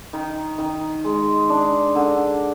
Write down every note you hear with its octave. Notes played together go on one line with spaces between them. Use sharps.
D#3
D#3
G#3
D4
D3